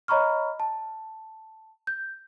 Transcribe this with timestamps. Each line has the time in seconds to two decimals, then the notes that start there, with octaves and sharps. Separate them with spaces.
0.08 C#5 D#5 A#5 B5 C#6 F6
0.60 A5
1.87 G6